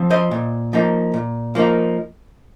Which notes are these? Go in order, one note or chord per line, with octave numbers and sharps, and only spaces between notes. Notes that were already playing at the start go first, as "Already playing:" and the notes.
Already playing: F3 C4
C5 D#5
A#2
F3 A#3 D#4
A#2
F3 A#3 D#4